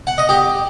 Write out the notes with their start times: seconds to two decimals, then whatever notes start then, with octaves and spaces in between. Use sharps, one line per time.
0.07 F#5
0.18 D#5
0.29 G4